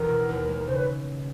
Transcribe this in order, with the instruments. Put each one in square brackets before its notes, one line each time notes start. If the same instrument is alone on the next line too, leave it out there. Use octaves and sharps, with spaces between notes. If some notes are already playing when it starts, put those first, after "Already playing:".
Already playing: [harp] E1 E2 [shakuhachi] A#4
[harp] B2
D#2
G#3
[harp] C#3 [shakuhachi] C5
[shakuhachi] B4